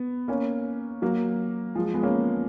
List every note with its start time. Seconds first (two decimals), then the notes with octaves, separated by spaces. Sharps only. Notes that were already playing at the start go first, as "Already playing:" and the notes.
Already playing: B3
0.28 A#3 C#4
1.02 F#3 A#3
1.75 F3 G#3
1.94 G#3 B3
2.03 A#3 C#4